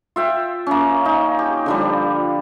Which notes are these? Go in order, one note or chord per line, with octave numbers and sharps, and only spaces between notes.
F4 E5 G5
A#3 C#4
D#4
G4
D3 F3 G3